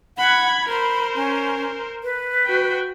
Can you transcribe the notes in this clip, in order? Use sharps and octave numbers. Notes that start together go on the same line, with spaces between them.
F#5 B5 G#6
A#4 C5 B5
C#4
B4
F#4 G5